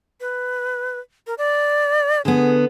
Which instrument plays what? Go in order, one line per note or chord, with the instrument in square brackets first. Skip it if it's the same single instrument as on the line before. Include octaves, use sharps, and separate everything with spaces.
[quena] B4
A#4
D5
[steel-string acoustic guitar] D3 B3 [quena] G#4